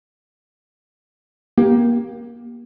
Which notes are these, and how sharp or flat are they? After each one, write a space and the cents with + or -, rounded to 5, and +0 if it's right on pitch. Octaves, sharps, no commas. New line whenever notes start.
A#3 +25 G4 +0